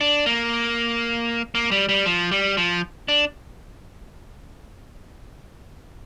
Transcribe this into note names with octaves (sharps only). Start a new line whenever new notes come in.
D4
A#3
A#3
G3
G3
F3
G3
F3
D4